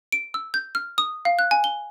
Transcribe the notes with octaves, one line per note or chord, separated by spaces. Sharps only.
D7
E6
G6
F6
D#6
F5
F#6
G#5
G7